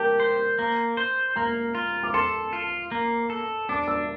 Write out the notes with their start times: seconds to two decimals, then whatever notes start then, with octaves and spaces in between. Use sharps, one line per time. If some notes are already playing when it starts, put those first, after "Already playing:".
Already playing: G4 A#4 A5
0.20 C5
0.59 A#3
0.97 C5
1.36 A#3 A#5
1.75 F4
2.03 D6
2.14 A4 C6
2.53 F4
2.92 A#3
3.30 A4
3.69 D4 D6
3.88 E6